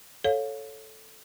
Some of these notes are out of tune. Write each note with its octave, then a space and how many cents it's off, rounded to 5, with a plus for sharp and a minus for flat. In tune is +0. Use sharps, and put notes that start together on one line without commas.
A4 +0 C#5 -5 F5 +15